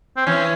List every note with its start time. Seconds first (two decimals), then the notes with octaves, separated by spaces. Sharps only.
0.17 C4
0.27 E3 C#4